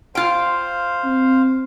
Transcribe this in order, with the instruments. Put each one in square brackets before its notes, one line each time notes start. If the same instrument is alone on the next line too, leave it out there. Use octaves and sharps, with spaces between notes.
[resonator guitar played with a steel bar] F4 G5 [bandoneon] C5 F5
[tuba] C4